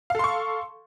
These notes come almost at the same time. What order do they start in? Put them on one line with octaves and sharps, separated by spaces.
F5 A4 C6 C#6